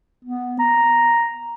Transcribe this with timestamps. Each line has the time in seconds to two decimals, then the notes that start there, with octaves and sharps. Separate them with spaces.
0.25 B3
0.59 A#5